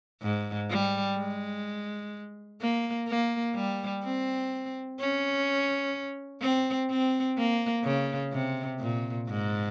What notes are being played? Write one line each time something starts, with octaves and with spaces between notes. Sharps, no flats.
G#2
G3
G#3
A#3
A#3
G3
C4
C#4
C4
C4
A#3
C#3
C3
A#2
G#2